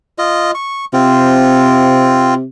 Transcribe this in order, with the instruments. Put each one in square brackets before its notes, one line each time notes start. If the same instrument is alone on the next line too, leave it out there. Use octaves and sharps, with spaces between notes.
[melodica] F4 D#5
C#6
[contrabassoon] C3 [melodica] C4 F4